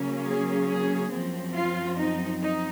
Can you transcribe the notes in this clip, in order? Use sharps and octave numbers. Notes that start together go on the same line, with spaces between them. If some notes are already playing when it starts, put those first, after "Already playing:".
Already playing: C#3 F#3 A#3 C#4
G#4
G#4
F#2 F3 C4
F4
D#4
D#4